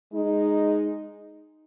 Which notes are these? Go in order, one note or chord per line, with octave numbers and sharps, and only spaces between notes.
G#3 D#4